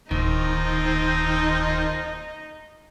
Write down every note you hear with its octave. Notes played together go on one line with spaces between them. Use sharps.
D1 D#3 F3 C4 D#4